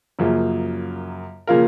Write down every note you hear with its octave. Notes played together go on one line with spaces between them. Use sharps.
F#2 C#3 F3 A#3
C#3 F3 A#3 F4 A#4